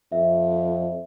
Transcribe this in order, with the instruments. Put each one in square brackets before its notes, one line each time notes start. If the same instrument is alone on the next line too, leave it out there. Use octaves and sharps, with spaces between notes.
[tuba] F2 [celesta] E5